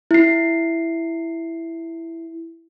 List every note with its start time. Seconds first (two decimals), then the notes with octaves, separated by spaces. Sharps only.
0.11 E4 C7